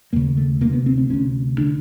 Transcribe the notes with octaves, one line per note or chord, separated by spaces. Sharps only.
D#2 C#3 A#3
A3
D2 C3 A#3
B3
C4
C4
D2 C3 C#4
D3 D4